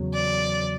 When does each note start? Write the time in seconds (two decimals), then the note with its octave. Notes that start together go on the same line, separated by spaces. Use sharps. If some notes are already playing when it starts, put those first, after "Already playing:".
Already playing: E2 C#3 F#3
0.13 D5